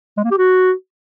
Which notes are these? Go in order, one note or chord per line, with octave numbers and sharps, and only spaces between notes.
G#3
A#3
G4
F#4